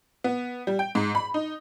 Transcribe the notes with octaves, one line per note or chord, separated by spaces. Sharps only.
B3
G3
G5
G#2
B5
D#4